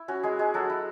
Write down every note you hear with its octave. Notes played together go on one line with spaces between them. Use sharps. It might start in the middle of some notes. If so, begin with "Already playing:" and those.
Already playing: E4
C#4 F#4
G#3 G#4
G#3 G#4
F#3 F#4 A4
E4